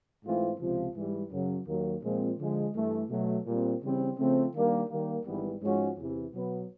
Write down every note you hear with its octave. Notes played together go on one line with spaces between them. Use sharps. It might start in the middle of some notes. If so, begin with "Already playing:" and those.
G#2 E3 A3 C4 F4
C#2 C3 F3
G#2 E3 G3
F#2 C#3 F#3
D#2 D#3 F#3 A#3
A#2 F3 G#3 C4
D3 F3 G#3
G2 E3 A3
B2 F#3 A3
A#2 G3 C4
C#3 E3 G3 C4
C#3 F3 A3 C4
D#3 G3 A#3 D4
D#3 G3 A#3
G#1 G#2 E3 G3 B3
G#2 F3 G#3 C#4 F#4
E2 C3 E3
B2 F#3 B3